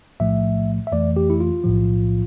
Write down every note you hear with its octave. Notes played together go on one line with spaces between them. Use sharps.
B1 A2 F3 A3 E5
E5
F2 E3 A3 D5
G4
E4
F4
B1 A2 F3